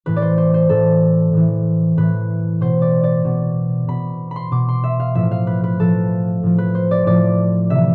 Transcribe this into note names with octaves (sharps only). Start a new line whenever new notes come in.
A2 E3 B4
D5
C5
C5
C5
A2 E3 A4
A2 E3
A2 E3 B4
B2 C5
D5
D5
B2
B2 B5
B5 C6
B2 D6
C6
E5
F5
A2 F3 E5
F5
B4
B4
A2 F3 A4
A2 F3
B4
C5
D5
A2 F3 D5
C3 E3 E5